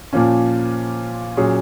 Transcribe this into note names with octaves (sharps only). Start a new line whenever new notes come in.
A#2 F3 A#3 C#4
A#2 F#3 C#4 G#4 C#5